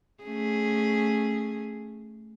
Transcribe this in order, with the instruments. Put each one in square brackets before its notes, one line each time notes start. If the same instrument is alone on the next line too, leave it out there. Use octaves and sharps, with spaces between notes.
[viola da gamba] A3 C#4 G#4